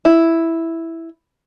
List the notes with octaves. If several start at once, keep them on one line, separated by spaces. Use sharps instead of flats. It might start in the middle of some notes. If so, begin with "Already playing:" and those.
E4